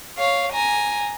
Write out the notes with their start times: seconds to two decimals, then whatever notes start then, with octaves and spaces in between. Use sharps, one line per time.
0.18 C#5 F5
0.53 G#5 A#5